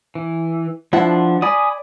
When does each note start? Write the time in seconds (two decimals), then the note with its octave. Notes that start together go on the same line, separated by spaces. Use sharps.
0.15 E3
0.93 F3 D4 E4 F#5
1.42 D5 G#5 B5 D#6